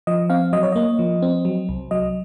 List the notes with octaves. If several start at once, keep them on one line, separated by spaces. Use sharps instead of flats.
F3 D#5
C4 F5
F#3 D#5
C#5
A#3 D#5
F3
C4
F#3
C2
F#3 D#5